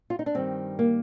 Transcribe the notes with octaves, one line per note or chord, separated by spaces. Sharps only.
F4
D#4
D4
G2 D#3 G3 C4
A#3